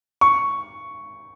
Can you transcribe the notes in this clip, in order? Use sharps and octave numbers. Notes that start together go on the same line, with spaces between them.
C#6